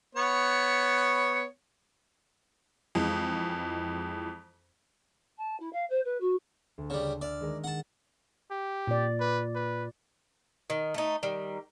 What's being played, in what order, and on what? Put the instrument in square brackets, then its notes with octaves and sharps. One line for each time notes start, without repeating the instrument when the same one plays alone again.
[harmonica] B3 C#5
[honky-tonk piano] F2 E3 G#3
[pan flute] A5
E4
F5
C5
B4
F#4
[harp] D2
[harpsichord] C#3 G3
[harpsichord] D5 [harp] E5 F6
[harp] D#3 G#3 A#4
[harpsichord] F#5 A5
[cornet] G4
[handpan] A#2 D5
[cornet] B4
B4
[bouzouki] D#3
A3 D#4
D#3 G3